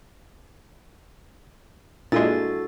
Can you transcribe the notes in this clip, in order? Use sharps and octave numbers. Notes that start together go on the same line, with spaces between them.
A#2 G#3 D4 E4 F#4 A4 A6